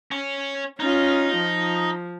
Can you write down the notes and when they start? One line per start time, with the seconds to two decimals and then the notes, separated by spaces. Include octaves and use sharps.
0.11 C#4
0.80 C#4 D#4 F4
1.37 F3